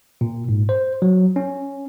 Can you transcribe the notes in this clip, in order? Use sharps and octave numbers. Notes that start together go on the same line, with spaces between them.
A#2
G#2
C5
F#3
C#4